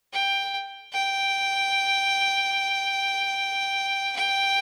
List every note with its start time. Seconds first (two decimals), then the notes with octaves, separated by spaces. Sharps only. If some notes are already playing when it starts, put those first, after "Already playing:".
0.13 G5
0.93 G5
4.16 G5